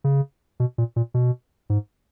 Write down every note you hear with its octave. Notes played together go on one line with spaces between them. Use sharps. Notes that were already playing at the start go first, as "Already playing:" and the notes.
C#3
B2
A#2
A#2
B2
G#2